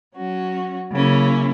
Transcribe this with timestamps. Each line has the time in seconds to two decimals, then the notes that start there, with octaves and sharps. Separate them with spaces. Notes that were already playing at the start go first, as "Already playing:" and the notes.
0.17 F#3 C#4 F#4
0.92 C#3 F#3 A#3 C#4 E4